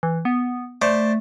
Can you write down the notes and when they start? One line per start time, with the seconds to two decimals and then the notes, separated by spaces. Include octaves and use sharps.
0.03 E3
0.25 B3
0.82 A3 C5 D5 A5